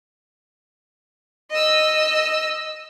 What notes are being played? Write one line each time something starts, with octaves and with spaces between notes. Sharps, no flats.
D#5 E6